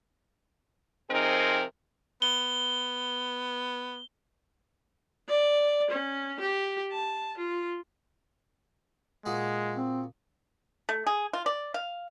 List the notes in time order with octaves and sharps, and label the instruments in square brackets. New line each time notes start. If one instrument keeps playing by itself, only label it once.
[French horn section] C3 F3 C4 D#4 G#4 A#4
[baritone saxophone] B3 [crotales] G7
[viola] D5
C#4
G4
A5
F4
[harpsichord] A#2 F#4 G#4 [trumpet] G#3
[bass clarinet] C4
[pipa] A3
G#4
F4
D5
F5